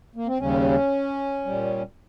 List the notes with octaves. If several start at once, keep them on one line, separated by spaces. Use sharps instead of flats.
A#3
C4
D#2 C#3 G3 C#4
A#2 G3